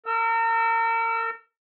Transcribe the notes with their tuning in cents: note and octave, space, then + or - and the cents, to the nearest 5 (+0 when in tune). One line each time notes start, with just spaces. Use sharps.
A#4 -35 E6 +0